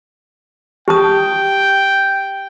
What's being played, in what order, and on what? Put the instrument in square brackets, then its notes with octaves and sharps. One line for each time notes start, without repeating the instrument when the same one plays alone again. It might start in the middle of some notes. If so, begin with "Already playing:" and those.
[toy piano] G4 A5 D#6 [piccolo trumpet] G5